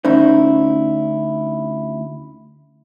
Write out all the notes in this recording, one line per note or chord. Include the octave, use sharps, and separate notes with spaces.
D2 C#4 D#4 E4 C5